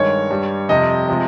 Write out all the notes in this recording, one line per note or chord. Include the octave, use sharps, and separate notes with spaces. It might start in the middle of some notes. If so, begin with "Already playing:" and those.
Already playing: G2 D#3 G#3 C#5
G2 G3
F2 C3 G3 D#5
C3 F3 G#3